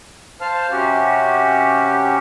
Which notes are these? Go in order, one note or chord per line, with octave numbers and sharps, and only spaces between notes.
C5 F5 A5 F6
C3 C#4 F#4 G4